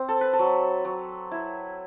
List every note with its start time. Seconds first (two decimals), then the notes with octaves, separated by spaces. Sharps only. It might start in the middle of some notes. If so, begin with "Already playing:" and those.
Already playing: C4
0.08 A4
0.21 B4
0.33 A4
0.39 F#3
0.85 F#3
1.31 E4